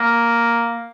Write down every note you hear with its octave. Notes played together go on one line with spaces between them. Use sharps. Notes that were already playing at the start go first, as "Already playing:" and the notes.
Already playing: A#3